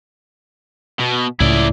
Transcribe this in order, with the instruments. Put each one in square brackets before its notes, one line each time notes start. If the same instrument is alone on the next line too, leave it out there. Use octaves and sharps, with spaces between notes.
[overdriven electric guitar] B2
[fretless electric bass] C#2 A2 [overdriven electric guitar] E4 D5